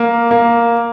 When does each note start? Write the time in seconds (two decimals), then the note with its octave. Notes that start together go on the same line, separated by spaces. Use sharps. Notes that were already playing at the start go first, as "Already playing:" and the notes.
Already playing: A#3
0.31 A#3